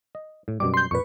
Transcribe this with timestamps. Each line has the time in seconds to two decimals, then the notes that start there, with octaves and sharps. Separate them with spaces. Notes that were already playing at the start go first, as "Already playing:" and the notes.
0.15 D#5
0.48 A2
0.60 F#2 B2 G3 D6
0.74 C6 G6
0.91 F2 A#2 B4 C#6